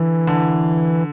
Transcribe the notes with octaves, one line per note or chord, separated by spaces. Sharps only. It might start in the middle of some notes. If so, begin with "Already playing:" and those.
Already playing: D3 E3
D3